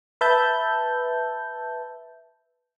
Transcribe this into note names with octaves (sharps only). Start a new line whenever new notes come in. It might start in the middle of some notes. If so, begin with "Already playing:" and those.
B4 E5 A5 G6